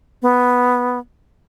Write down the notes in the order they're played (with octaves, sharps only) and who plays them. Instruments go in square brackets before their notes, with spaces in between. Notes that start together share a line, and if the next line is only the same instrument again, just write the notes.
[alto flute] B3